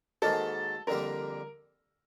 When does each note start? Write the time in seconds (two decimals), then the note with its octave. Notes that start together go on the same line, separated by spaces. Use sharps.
0.22 G#2 D#3 F#3 A#3 D#4 A4
0.87 F2 D3 G3 A#3 A#4